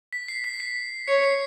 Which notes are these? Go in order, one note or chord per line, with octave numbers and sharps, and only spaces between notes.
B6
C7
B6
C7
C#5 C#7
C7